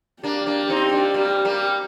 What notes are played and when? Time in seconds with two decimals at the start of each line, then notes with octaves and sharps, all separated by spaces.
0.23 A#3 D4 G4
0.46 A#3 D4
0.69 C4 D#4
0.91 A#3 D4
1.14 G3 A#3
1.45 G3 A#3